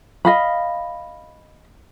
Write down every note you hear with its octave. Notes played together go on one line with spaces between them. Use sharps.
D#5 F5 B5